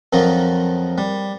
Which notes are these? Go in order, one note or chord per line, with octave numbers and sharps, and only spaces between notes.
F2 D#3 F3 F#3 D#4
G3